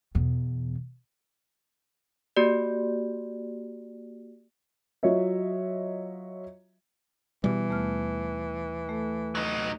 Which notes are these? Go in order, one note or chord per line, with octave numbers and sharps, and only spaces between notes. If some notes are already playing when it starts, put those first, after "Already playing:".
E2 B2
A#3 F#4 G4 D5
F#3 F4 C#5 D#5 E5
B2 E3 G3
D#2 A3 F6
A3 A4
F#3 D#4